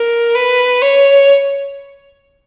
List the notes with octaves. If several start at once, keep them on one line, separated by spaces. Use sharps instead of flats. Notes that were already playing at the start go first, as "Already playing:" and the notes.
Already playing: A#4
B4
C#5